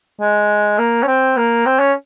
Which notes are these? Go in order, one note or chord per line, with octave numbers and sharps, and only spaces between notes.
G#3
A#3
C#4
C4
A#3
C4
C#4